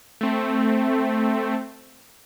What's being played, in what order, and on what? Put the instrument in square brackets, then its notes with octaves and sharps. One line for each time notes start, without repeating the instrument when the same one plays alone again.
[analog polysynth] A3 C4